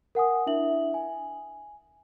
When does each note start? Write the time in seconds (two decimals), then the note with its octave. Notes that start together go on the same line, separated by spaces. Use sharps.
0.15 A#4 F#5 G#5 D#6
0.47 D4 E4 E5 F#7
0.94 G#5